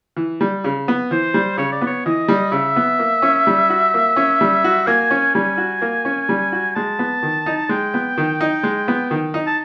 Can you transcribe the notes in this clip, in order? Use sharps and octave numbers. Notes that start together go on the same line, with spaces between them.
E3
G3
C#3
B3
E3 C5
G3
C#3 C#5
D5
B3
C#5
E3 D#5
G3
C#3 E5
B3
A#3
C#4
G3
F#4
A#3
C#4
G3
F#4
A#3 G#5
C#4
G3 G#5
F#4
A#3
C#4
G3
F#4
G#3 A5
B3
D#3
D#4
G#3 G5
B3
D#3
D#4
G#3
B3
D#3
D#4
A5